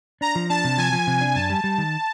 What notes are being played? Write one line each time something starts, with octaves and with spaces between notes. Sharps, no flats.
D4 A#5
F3
D4 A5
C3
F3 G#5
F3
C3
D4
F#2 A5
G3
G3
D#3